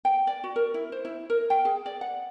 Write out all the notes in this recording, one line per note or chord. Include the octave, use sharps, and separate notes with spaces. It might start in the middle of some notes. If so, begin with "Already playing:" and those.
G5
D5
F#4
A#4
E4
C5
E4
A#4
G5
G#4
D5
F#5